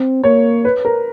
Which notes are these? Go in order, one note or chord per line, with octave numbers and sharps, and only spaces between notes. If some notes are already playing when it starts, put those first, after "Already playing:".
Already playing: C4
A#3 C#5
B4
A#4